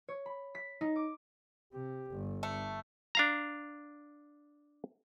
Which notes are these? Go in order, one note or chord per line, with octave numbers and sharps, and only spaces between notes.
C#5
B5
B6
D#4
D6
C3 G4
G1
A3 D4 A4
D4 F5 A#5